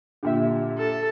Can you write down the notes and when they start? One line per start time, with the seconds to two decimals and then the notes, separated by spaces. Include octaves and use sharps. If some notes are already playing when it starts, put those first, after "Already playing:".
0.23 A#2 D3 G4 E5
0.79 A4